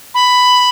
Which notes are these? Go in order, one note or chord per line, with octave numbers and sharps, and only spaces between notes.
B5